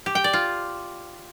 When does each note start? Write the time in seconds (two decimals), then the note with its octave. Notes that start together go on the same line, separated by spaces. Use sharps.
0.06 G4
0.15 G5
0.24 D5
0.33 F4